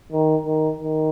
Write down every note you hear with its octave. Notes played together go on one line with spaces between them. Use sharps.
D#3
D#3
D#3